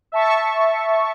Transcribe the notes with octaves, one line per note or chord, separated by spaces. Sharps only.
E5 A5 C#6